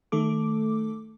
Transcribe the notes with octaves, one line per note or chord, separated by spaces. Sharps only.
D#3 A3 A4 D6